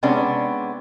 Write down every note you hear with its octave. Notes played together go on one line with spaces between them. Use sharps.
C3 G#3 B3 C#4 D4